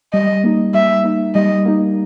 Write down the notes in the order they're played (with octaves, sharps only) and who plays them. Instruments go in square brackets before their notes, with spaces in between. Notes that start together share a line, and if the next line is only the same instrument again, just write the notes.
[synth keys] G3 [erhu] D#5
[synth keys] A#3 D#4
[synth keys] G3 [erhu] E5
[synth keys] A#3 D#4
[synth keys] G3 [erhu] D#5
[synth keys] A#3 D#4